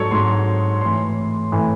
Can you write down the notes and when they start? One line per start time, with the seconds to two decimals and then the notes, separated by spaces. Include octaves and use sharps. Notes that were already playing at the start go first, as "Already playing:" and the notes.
Already playing: G#2 F#3 A4 C#5
0.11 G#2 F#3 C6
0.81 A2 E3 C6
1.52 A2 E3